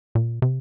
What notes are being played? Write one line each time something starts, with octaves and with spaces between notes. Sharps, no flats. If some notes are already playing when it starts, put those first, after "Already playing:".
A#2
C3